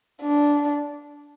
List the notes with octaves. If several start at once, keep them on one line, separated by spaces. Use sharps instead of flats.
D4